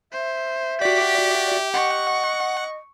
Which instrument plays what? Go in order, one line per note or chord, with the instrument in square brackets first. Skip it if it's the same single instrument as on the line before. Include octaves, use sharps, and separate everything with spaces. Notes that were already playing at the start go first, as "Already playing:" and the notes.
[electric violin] C5 [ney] E5
[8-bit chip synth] F#4 D5 [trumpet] G4 [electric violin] B6
[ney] D#5 [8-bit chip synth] F#5 [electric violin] C#6